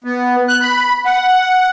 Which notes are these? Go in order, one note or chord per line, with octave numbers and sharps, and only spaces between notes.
B3
F#6
B5
F#5